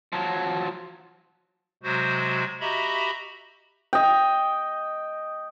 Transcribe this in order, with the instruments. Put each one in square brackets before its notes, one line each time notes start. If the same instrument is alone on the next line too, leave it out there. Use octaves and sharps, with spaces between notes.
[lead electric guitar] F3 F#3
[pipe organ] C3 F#3 G#3 F#4 C5
F#4 G4 D#5 E5 A#5 B5
[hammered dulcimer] D#5 G5